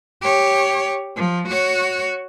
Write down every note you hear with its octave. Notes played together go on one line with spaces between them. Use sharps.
G4 C#5
F3
F#4 C#5